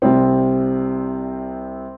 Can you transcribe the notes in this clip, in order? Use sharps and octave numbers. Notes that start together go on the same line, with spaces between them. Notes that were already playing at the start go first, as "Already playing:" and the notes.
C2 C3 G3 C4